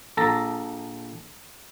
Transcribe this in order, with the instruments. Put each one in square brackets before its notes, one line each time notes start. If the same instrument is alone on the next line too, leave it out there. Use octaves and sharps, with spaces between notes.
[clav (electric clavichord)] A#1 A4 A#5